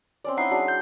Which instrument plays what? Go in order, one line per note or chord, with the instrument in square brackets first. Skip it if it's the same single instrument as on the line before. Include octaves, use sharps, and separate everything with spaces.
[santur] C4 C#4 D5
[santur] D#4 E4 D#5 [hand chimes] F#5 C7
[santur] F#3 D4 G#4
[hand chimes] G6